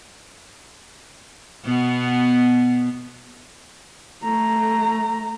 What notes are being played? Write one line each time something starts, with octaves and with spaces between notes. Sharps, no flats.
B2 B3
A3 A#5